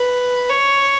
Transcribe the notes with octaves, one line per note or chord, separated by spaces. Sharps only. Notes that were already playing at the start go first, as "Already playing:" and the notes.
Already playing: B4
C#5